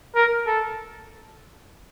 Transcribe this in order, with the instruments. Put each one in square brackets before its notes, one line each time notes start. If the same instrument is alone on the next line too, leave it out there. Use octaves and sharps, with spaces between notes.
[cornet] A#4
A4